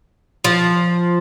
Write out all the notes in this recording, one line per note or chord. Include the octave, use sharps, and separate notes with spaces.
F3